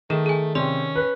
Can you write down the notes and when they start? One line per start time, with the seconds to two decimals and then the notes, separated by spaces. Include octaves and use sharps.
0.10 D#3 A3 G#4 E7
0.26 G#4 G#5
0.55 C3 C#4 D5 C6
0.95 B4